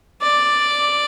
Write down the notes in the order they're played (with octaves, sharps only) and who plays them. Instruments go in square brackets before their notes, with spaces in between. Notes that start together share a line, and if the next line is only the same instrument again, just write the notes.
[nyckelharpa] D5